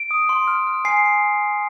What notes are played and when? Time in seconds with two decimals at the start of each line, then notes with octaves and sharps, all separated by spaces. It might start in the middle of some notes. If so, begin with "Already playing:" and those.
Already playing: D7
0.11 D#6
0.29 C6
0.47 F6
0.67 F6
0.85 G#5 C7
1.05 G#5